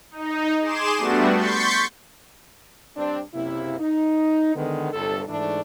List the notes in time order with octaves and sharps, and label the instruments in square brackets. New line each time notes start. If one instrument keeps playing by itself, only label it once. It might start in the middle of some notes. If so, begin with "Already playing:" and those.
[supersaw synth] D#4
G#4 C6 D6 E7
G3 A3 B3 D4 F#4
C6 C#6 G6 A6 B6 C#7
[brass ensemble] G2 C4 D4
F#1 C3 A#3 E4
D#4
D3 D#3 G#3 B3
G1 C2 A4
G#2 E3 A3 D4